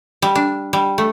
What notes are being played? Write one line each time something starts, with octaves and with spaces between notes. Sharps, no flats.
G3
D4
G3
A3